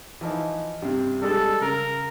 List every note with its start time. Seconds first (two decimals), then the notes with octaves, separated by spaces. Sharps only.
0.21 E3 F3 D#4
0.82 G2 C3
1.22 G3 G#3 D4 A4
1.61 C#3 A#4